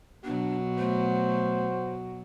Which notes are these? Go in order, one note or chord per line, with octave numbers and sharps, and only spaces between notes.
B2 F#3 D4 F#4
A3 C5